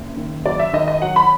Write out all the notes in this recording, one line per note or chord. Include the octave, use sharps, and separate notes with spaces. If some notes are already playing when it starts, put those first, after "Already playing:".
Already playing: F#1
D#3
F#3 D5
E5
D#3 D#5
D#5
F#3 F#5
B5